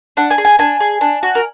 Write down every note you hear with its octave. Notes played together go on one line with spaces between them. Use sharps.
D4 F#5
G#5
G#4
G#5
D4 G#5
G#4
D4
F#4
A#4